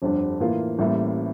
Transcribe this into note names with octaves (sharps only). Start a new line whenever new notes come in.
G1 F2 D3 G3 D4
A2 E3 A#3 F4
A1 A2 G3 A#3 E4